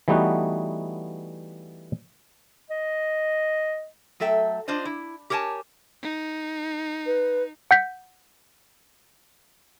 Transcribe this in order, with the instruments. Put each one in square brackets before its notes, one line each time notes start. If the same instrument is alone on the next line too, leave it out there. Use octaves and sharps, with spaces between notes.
[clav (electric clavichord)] E3 G3 A3 B3 D#4 F#4
[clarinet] D#5
[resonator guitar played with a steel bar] F#3 A3 A4 E5 G5
D4 F4 C5 D5 D#5
E4
G4 A#4 C#5 G#5 A5
[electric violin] D#4
[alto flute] B4
[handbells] F#5 G6 B6